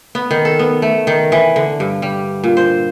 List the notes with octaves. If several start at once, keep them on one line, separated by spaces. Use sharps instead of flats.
B3
D#3
A4
B3
A3
D#3
E3
D3
G2
G3
A#2
C5